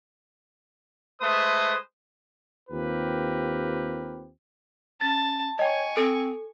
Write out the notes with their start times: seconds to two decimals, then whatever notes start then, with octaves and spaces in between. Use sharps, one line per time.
1.21 G#3 A3 B4 C5 D#6
2.70 D#2 C4 F4 G4 A#4 B4
5.01 C#4 A5 A6
5.59 C#5 D#5 G5 G#5 C#6
5.97 C4 A4